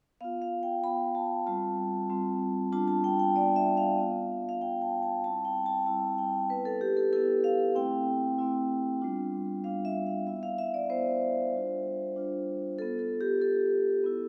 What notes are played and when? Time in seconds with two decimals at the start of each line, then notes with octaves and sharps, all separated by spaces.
0.21 B3 F4 F5
0.42 F5
0.63 G5
0.84 B3 F4 B5
1.15 A5
1.46 G3 C4 F4 A5
2.10 G3 C4 F4
2.72 G3 B3 D4 F4 A5
2.88 A5
3.04 G5
3.19 G5
3.36 G3 B3 D4 F4 D5
3.56 E5
3.77 F5
3.98 B3 F4
4.49 F5
4.61 B3 F4 G5
4.82 A5
5.03 A5
5.24 G3 C4 E4 A5
5.45 G5
5.66 A5
5.86 G3 C4 E4 A5
6.18 G5
6.50 B3 E4 B4
6.65 A4
6.81 G4
6.97 A4
7.13 B3 E4 A4
7.44 F5
7.75 A3 C4 E4 G5
8.39 A3 C4 E4
9.02 G3 B3 D4 F4
9.64 G3 B3 D4 F4 F5
9.85 E5
10.07 F5
10.27 B3 E4 E5
10.43 F5
10.58 E5
10.74 D5
10.90 B3 E4 C5
11.53 G3 D4 F4
12.16 G3 D4 F4
12.79 B3 F4 A4
12.99 A4
13.21 G4
13.41 B3 F4 A4
14.04 B3 E4